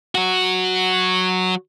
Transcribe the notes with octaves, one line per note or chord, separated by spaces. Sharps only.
F#3 F#4